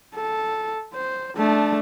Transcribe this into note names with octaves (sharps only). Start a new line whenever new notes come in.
A4
C5
A3 D4